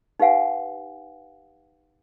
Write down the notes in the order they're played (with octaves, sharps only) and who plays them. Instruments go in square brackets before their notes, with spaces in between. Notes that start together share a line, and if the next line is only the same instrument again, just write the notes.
[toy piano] D#4 G4 B4 F5 F#5 G#5